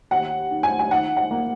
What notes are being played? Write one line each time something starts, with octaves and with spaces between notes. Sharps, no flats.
D#2 F#5
D#3
G#5
G#5
D#3 F#5
F#5
A#3